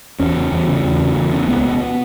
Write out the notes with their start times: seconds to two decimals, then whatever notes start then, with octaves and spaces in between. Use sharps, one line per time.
0.20 E2 C#4
0.36 C#3
0.52 E2
0.68 C#3
0.84 E2
1.00 C#3
1.16 E2
1.32 C#3
1.48 C#2 B3
1.64 B2